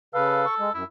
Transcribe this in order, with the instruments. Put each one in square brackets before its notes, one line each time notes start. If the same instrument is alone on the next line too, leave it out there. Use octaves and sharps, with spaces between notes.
[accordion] C#3 B4 F5 [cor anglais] A4
[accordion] C#6
G#3
[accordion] F#2 [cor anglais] E4